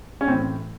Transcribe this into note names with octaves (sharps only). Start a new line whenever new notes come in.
C#4
A2 E3 C4